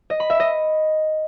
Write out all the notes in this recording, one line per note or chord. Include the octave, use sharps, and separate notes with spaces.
D#5
B5
E5
D#5